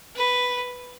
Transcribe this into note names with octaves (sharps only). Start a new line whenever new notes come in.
B4